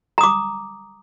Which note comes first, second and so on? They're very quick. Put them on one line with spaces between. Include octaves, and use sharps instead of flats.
A#5 D#6 D6